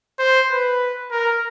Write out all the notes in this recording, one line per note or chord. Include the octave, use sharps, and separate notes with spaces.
C5
B4
A#4